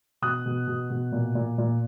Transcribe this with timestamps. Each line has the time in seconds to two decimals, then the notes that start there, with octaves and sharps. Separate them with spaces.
0.22 B2 D#6 F#6
0.46 B2
0.67 B2
0.90 B2
1.12 A#2
1.35 A#2
1.58 A#2